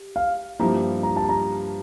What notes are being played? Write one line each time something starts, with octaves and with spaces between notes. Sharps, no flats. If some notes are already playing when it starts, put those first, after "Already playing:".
Already playing: G4
F5
G2 F3 A#3 E4 G4 A#5
A#5
A5
A#5